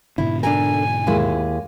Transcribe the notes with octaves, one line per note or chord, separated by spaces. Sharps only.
G#2 B2 D3 E4
D4 A4 A#4 G#5
D#2 G#3 E4